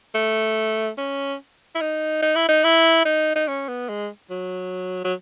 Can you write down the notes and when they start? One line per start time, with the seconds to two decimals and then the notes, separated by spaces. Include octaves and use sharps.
0.15 A3
0.97 C#4
1.75 E4
1.81 D#4
2.22 D#4
2.36 E4
2.49 D#4
2.64 E4
3.05 D#4
3.35 D#4
3.48 C#4
3.68 B3
3.89 G#3
4.30 F#3
5.05 F#3